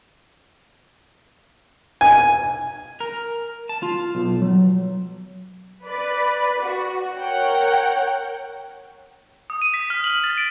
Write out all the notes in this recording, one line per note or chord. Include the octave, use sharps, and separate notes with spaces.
G#5
A#4
A5
F4
B1
F#3
B4 D5 B5
F#4
A#4 C#5 F#5 G5
D#6
D#7
B6
F6
F#7
A6
D7